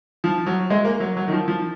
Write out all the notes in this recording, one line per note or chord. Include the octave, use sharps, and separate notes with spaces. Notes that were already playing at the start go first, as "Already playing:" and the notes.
F3
F#3
G#3
A#3
F#3
F#3
D#3
F3
F3